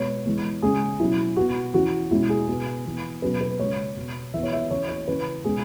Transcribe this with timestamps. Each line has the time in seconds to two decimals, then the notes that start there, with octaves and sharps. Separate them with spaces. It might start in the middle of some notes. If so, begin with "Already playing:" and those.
Already playing: B2 G#3 B3 C#5
0.26 E3 G#3 B3
0.63 C#3 G#3 C#4 G#4
1.00 B2 F#3 C#4 E4
1.37 B2 B3 F#4
1.74 E3 C#4 F#4
2.11 B2 G#3 C#4 E4
2.30 G#4
2.48 B2 B3
2.85 E3 B3
3.22 B2 F#3 C#4 B4
3.41 B4
3.59 C#3 G#3 C#4 C#5
3.96 B2 B3
4.34 E3 B3 E5
4.43 C#5
4.53 E5
4.71 E3 C#4 C#5
4.89 C#5
5.08 C#3 E3 C#4 B4
5.45 B2 G#3 C#4 G#4